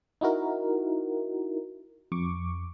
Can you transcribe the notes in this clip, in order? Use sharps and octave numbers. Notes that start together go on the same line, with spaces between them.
D#4 E4 F#4 A#4
F2 C#6 D6